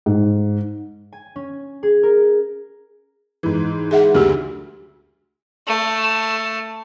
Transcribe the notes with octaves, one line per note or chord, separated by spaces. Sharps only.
G#2
G#5
C#4
G#4
A#4
G#2 E3
G#4 E5 F#5
D2 F#4 G4
A3